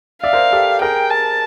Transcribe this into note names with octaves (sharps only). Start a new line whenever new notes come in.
D5 E5 F5
A#4 C5
G4 A4
G#4 A#4 G5
A5